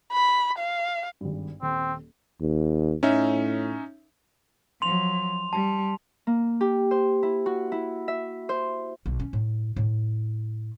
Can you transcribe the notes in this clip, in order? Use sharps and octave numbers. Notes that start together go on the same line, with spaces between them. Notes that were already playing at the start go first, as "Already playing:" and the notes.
B5
F5
G#1 G2
D#1 C4
D#2
A2 C#4 D#4 E5
F3 F#3 C6 F7
G3 A5
A#3
G4
C5
E4
F#4
E4
E5
C5
B1
C#4
A2
A2